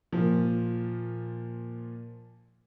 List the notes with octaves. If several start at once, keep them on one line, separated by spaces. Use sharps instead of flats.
A#2 F3